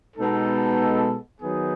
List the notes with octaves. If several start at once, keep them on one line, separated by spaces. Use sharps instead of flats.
B2 G#3 B3 D#4 A4
D#3 F#3 B3 D#4 G#4